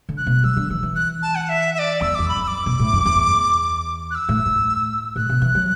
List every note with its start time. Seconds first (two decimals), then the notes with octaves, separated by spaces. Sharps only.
0.09 D3
0.17 F#6
0.26 B2
0.44 F#3 E6
0.56 D3
0.70 E3
0.83 E3
0.96 F#6
1.23 A5
1.35 F#5
1.49 E5
1.75 E5
1.79 D5
2.01 E2 E6
2.15 E2 D6
2.29 B5
2.36 F#2
2.43 E6
2.48 D6
2.66 B2
2.79 A2
2.93 F#2
3.05 E2
4.11 F#6
4.15 E6
4.29 A2
4.46 A2
5.16 A2 F#6
5.29 B2
5.42 E3
5.55 F#3